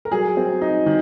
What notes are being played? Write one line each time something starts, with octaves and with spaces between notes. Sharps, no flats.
A#4
F#3 G#4
C4
D#4
D#3